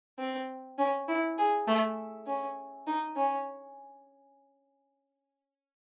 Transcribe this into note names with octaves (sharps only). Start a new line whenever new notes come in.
C4
C#4
E4
G#4
A3
C#4
D#4
C#4